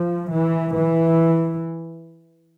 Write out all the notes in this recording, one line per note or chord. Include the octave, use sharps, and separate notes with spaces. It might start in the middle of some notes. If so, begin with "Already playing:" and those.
Already playing: F3
E3
E3